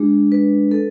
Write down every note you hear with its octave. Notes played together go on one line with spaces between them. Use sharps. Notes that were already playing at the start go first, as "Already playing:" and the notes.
Already playing: G#3 D4 G#4
B4
A4